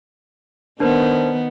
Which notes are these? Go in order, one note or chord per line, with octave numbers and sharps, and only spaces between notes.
D#3 B3 D4 A#4 C5